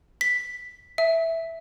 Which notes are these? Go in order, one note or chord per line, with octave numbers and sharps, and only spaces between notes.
B6
E5